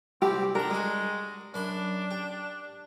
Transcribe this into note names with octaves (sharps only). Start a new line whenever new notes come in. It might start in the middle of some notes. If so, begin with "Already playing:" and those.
C2 C4 G4 B4
D4 G4 A#4 F#5
G3 G#3 F#4
F#2 D4 B5 C6
G4